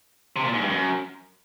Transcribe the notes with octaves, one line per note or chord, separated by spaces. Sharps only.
C3
A#2
G#2
G2
F#2